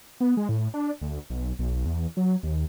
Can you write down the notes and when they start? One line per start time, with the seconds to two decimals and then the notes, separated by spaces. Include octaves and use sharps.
0.20 B3
0.37 G#3
0.49 A2
0.74 D4
1.02 D2
1.30 B1
1.59 B1
1.85 E2
2.17 F#3
2.43 D#2